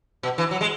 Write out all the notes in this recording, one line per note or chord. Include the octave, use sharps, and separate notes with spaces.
B2
E3
F#3
G#3